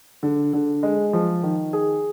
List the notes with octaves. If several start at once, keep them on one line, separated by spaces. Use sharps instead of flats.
D3
D3
G#3
F3
D#3
G#4